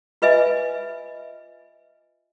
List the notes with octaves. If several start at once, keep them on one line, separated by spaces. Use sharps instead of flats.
F4 B4 D#5 E5 G#5